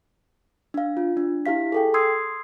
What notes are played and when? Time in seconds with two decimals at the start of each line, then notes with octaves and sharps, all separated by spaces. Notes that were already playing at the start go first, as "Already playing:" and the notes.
0.74 D4 F5
0.97 F4
1.17 D4
1.46 E4 G4 F5 B6
1.72 G#4 A4 G5
1.94 C6 D#6 E6 G#6 C7